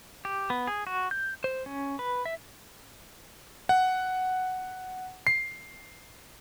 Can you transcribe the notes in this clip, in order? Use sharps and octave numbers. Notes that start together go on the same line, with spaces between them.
G4
B3
G#4
F#4
G6
C5
C#4
B4
E5
F#5
C7